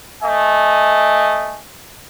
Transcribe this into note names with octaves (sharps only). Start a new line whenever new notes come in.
A3 D#5 G#5